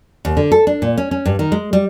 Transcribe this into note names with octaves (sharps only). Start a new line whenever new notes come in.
D#2
D3
A4
D4
A#2
C#4
C#4
G2
D#3
G#3
G3